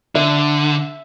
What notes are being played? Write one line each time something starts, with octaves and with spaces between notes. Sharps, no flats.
D3 E5